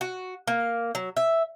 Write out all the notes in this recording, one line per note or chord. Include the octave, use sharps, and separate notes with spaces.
F#4
A#3
F#3
E5